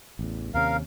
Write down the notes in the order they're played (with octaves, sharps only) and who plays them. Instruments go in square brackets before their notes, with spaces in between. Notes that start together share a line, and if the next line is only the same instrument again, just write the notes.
[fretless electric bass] A1 E2
[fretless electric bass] D#2 C3 C#4 [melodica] A#4 F5